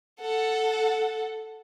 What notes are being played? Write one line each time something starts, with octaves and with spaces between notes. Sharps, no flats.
A4 F#5